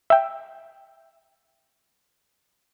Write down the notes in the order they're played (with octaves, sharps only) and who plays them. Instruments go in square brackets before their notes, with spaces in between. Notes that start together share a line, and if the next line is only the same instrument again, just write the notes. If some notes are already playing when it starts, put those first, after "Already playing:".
[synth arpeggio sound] E5 G5